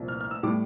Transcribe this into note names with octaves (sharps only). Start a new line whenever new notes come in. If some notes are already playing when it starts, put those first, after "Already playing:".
Already playing: C2 A#2 F3
F6
F6
E6
A2 G3 D6